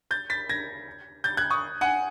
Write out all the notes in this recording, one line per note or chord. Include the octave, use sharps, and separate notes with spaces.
G6 A6
A6 B6
G#6 A#6
G6 A6
F#6 G#6
C#6 D#6
F#5 G#5